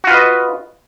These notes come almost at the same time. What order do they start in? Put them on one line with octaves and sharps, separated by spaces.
F#4 F4 B4 D#5